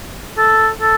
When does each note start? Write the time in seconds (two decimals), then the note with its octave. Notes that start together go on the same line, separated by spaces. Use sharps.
0.38 A4
0.81 A4